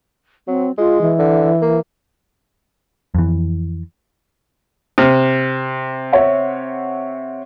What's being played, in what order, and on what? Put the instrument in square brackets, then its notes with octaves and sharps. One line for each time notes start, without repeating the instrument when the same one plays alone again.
[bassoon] F#3 [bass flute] C4
[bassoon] G#3 [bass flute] F4
[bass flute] E3
[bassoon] D3
A#3
[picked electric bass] F2 E3
[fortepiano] C3 [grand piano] F6
[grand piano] C#5 E5 F#5